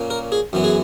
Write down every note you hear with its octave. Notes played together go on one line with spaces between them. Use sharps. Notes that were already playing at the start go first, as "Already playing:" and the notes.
Already playing: A#2 A#3 C#4
A#4
G#4
F#2 E3 B3
G#4